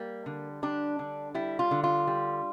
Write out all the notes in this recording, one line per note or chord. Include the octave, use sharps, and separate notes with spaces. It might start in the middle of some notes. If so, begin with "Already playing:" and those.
Already playing: G3 A#3
D3
G3 D4
D3
G3 E4
F4
D3
F4
G3